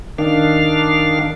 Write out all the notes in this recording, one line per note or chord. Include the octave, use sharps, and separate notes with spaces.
D#3 D4 F5